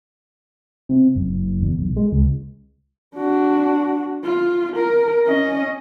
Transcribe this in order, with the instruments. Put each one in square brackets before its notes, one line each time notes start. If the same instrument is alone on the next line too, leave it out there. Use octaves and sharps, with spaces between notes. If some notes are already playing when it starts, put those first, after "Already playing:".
[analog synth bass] C3
F#1
F#1
E2
B1
G#3
C#2
[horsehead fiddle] D4 F#4
F4
A#4
C#4 D#5